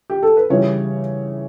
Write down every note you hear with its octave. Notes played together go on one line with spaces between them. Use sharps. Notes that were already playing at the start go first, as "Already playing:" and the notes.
G4
A4
B4
C#3 E3 G3 C#5